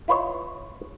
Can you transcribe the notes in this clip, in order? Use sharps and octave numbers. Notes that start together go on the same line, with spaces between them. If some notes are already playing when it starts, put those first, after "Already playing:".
E4 F4 B4 C#5 D#5